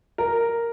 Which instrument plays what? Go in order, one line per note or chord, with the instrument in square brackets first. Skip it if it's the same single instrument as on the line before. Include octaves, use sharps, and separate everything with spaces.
[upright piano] A#4